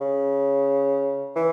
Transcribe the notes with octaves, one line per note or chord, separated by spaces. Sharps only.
C#3
E3